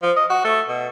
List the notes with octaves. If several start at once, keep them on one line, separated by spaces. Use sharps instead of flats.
F3
D#5
F#4
A3
B2